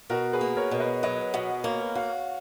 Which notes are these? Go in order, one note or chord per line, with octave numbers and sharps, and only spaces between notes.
B2 F#4 A#4
G#4 B4
A#3
A#4 C#5
B2
B4 D#5
F#3 B4 D#5
B2 D#5 F#5
A#3 C#5 F5
F#4 C#5 F5